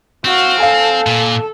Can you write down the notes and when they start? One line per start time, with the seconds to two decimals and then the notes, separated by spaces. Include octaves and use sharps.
0.25 C4 F#4 F5
0.60 A4 F5 G#5
1.06 A#2